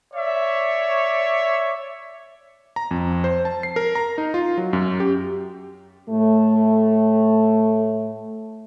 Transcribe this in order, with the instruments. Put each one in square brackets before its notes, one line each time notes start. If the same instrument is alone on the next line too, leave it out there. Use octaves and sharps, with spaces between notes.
[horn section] C#5 D5 E5
[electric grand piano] A#5
F2
C5
A5
C7
A#4
A#5
D#4
F4
F#3
F#2
G4
[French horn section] A2 A3